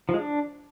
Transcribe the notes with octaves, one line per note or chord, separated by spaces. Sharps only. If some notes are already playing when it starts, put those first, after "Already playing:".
F3
G#3
D4